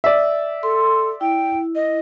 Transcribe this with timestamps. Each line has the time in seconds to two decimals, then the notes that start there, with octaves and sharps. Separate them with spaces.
0.04 D5 E5
0.63 A4 C6
1.21 E4 G5
1.75 D#5